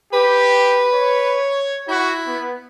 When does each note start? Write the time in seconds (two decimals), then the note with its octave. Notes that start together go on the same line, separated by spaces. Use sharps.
0.13 G4 B4
0.92 C#5
1.88 E4 F#4
2.27 B3